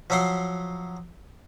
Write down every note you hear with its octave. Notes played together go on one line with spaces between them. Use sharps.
F3 F#3 E5 F#5 C6